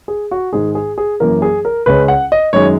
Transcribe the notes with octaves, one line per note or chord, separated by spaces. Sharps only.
G#4
F#4
G#2 D#3 G#3 G#4
G#4
G#4
F#2 E3 A#3 A#4
G#4
A#4
C#2 C#3 G#3 C#4 B4
F#5
D#5
F#2 D#3 G#3 C#5